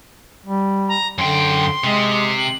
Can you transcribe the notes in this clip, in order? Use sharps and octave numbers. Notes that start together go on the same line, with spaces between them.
G3
A#5
F#2 D3 G5 C6
C3 G#3
F#7